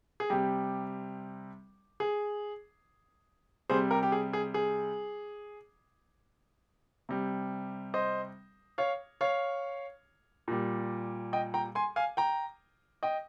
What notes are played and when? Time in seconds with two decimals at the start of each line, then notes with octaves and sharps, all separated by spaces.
0.20 G#4
0.30 C3 G3 G4
2.00 G#4
3.70 C3 G3 G#4 C5
3.91 G4 A#4
4.03 G4
4.12 G#4
4.33 G#4
4.54 G#4
7.09 C3 G3
7.94 C5 D#5
8.78 C#5 F5
9.21 C#5 F5
10.48 A#2 G3
11.33 D#5 G5
11.54 G5 A#5
11.75 G#5 C6
11.96 F5 G#5
12.17 G5 A#5
13.03 D#5 G5